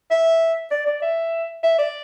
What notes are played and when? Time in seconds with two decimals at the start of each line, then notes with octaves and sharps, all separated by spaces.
0.11 E5
0.71 D5
0.86 D5
1.01 E5
1.63 E5
1.78 D5